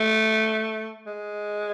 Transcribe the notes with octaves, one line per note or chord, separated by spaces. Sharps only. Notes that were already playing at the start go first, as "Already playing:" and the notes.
Already playing: A3
G#3